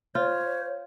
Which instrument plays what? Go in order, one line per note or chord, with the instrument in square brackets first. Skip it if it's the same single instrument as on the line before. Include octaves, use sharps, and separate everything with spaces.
[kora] F4 [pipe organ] C5 [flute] C#5